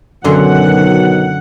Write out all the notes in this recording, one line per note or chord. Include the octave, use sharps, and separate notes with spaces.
F#2 B2 D3 D#3 F#3 F#5 C6